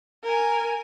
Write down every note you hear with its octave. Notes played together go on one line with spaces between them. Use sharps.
A#4 G#5